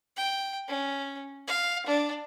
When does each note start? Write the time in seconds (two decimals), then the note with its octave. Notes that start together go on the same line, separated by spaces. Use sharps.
0.17 G5
0.68 C#4
1.47 F5
1.86 D4